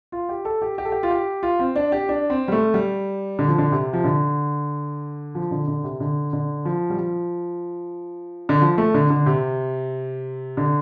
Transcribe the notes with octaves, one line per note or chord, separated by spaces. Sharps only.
F4
G4
A4
G4
G4
A4
G4
F4
G4
F4
C4
D4
G4
D4
C4
G3
A3
G3
D3
F3
D3
C3
F3
D3
F3
D3
D3
C3
D3
D3
F3
G3
F3
D3
F3
A3
D3
D3
C3
D3